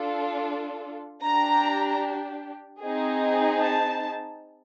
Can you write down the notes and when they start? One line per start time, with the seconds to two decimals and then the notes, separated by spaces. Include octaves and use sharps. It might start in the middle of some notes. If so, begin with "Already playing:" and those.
Already playing: D4 F4 A4
1.23 D4 A#5
1.28 G4
2.81 C4 D#4 G#4
3.60 A5